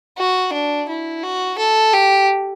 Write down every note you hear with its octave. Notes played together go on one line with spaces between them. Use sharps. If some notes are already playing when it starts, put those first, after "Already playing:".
F#4
D4
E4
F#4
A4
G4